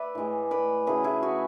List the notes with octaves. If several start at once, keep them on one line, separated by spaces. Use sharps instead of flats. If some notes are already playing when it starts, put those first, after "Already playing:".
Already playing: B4 D5 E5
A2 E3 G#3
B4 D5
C#3 F#3 A3 E4 G#4 B4
E4 G#4
F#4